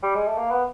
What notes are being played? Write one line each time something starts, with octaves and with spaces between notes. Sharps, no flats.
G3
G#3
A3
A#3
B3